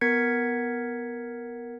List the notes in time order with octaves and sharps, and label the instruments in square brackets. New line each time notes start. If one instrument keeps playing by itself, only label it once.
[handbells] B3 A#4 G#6 B6 C#7